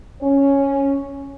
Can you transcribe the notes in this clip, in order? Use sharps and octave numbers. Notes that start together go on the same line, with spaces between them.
C#4